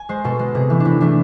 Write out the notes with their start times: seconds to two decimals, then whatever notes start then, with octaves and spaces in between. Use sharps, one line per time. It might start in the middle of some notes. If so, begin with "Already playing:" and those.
Already playing: G#5
0.09 G#3 C5
0.24 B2 A4
0.39 G#3
0.55 C3 G#4
0.70 E3 A3
0.80 D4
0.85 C3 E4
1.00 E3 A3 D4